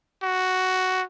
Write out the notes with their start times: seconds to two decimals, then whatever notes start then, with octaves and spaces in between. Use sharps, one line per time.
0.23 F#4